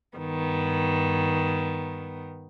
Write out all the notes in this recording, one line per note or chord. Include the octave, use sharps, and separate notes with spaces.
G2 D#3 B3